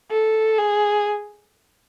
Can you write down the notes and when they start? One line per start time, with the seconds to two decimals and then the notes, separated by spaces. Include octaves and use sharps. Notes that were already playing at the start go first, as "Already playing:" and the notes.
0.11 A4
0.58 G#4